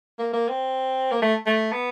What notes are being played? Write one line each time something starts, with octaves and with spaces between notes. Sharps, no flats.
A#3
A#3
C4
A#3
A3
A3
B3